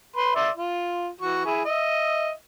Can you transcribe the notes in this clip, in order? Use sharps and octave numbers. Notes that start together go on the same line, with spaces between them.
B4 C6
D5 E5 C6
F4
E3 F#4 C#6
E4 G#4
D#5 E5